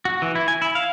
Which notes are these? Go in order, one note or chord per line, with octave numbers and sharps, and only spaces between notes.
F#4
E3
E4
G#5
E4
F5